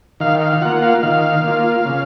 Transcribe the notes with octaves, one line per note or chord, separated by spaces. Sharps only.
D#3 F5
F5
F5
A#3 F4 F#5
F#5
F5
D#3 F5
A#3 F4
C#3